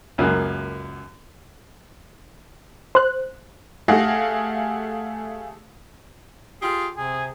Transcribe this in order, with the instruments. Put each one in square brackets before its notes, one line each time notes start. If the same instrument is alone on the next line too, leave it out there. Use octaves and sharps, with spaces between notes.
[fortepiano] C#2 F#2 A#3 G#4
[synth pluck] C5 F#6
[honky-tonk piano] A3 G4 G#4 F5 F#5 A#6
[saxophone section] F4 G4 G#4
[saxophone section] C3 [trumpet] G#4